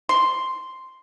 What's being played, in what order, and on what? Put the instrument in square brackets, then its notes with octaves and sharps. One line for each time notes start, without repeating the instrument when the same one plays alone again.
[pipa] C6